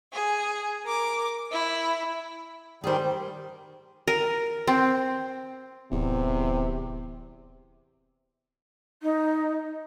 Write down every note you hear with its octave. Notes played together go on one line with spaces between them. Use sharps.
G#4
A#4 D6
E4
D#3 G3 G#4 C5
A#4
C4
D1 E2 C3
D#4